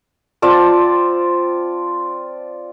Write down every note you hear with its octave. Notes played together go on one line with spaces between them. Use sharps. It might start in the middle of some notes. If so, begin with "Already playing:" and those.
C4 F4 D5 A5